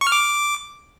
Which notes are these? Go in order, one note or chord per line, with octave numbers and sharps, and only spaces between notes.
C#6
F6
D6